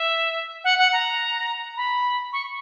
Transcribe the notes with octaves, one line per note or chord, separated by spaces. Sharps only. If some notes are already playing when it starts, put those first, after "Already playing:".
Already playing: E5
F#5
F#5
A#5
B5
C#6